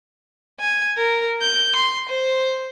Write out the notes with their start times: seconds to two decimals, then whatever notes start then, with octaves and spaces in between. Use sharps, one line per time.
0.60 G#5
0.98 A#4
1.42 G6
1.76 C6
2.09 C5